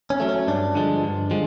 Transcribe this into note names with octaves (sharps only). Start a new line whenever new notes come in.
C#4
F#3 A3
C#4
G2 D4
D3 F3 G#3
G2
D3 F3 G#3